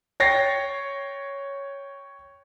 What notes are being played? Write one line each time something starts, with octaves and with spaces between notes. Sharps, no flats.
C#5 G5 A6 A#6 C7